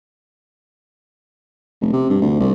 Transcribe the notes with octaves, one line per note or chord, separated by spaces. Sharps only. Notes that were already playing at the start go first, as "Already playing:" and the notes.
F1
C3
G2
D2
C2